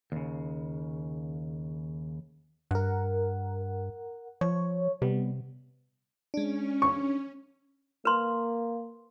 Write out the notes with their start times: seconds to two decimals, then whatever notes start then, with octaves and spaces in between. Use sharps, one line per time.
0.12 D#2 C#3
2.71 G2 A#4 F#5
4.41 F3 C#5
5.02 C3 G3 B3
6.34 G#3 C#4 D4
6.82 C#6
8.05 A#3 B4 C6